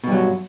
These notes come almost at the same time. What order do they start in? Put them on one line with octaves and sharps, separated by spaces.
B2 G2 F#3